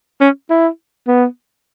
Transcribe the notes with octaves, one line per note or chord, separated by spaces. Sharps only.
C#4
E4
B3